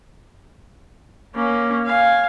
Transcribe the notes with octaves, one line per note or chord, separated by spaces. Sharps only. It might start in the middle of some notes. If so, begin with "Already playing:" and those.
A#3 C#4
F5 G#5